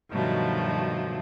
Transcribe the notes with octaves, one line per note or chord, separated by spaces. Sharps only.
G2 B2 D#3 F3 F#3 A3